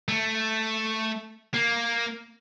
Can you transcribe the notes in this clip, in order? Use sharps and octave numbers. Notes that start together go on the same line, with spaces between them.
A3
A#3